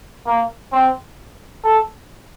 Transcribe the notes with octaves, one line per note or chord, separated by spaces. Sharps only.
A#3
C4
A4